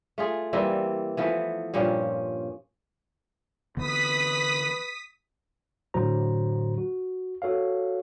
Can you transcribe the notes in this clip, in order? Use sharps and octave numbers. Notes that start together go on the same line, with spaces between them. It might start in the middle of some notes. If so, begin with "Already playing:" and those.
A3 F4 G#4
E3 G3 A#3 C4
E3 F3 A3 B3
G2 A#2 F3 C#4
D3 E3 B3 B4 D#6 B6
A2 D3 F#3 F#4 C5 A#5
F#4
F#4 A4 C#5 F5